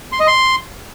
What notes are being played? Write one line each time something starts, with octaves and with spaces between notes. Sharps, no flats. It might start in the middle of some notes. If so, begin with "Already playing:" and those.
C6
D#5
C6